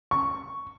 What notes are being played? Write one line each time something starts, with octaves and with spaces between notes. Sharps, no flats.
C#6